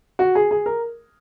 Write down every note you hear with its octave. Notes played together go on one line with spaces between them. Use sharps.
F#4
G#4
G#4
A#4